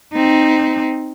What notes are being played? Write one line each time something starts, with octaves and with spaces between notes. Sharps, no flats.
C4 D#4